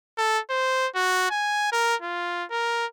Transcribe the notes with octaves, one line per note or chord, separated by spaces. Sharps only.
A4
C5
F#4
G#5
A#4
F4
A#4